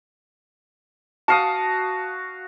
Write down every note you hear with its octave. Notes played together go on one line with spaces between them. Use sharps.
F#4 F5 A5 D#6